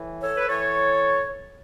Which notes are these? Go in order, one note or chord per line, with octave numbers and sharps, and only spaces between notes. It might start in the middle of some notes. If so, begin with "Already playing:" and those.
Already playing: A2 E3
A4 C#5
B4
A2 E3 A4 C#5